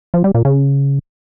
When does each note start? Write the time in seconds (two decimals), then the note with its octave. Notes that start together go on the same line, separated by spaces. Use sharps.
0.14 F3
0.24 G3
0.35 A#2
0.45 C#3